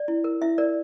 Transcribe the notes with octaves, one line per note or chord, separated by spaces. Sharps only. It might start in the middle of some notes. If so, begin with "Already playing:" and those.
Already playing: D5
E4
A#4
E4 E5
A#4 D5